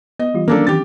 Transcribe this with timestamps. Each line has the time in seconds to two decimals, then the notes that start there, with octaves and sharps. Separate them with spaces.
0.19 B3 D#5
0.34 E3 G3 F4
0.48 D#3 F#3 A#3 C#4 D4 A4
0.67 D#3 E3 C4 G4 A6